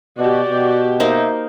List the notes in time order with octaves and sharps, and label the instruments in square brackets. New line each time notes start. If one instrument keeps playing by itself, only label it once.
[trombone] B2 [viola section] F#4 G4 [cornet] D5
[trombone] B2
[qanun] A#3 D#4 C5 [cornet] E5